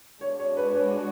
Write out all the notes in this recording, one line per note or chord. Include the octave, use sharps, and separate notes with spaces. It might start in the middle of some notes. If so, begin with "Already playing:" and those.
G#3 D4 F#4 C#5
C#5
B4
C#5